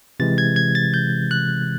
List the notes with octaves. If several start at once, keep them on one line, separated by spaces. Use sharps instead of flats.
C3 E3 G#3 A6
G#6
G#6
A6
G6
F#6